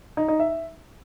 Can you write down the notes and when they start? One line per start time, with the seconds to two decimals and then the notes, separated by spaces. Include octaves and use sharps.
0.17 D#4
0.28 D#4
0.40 E5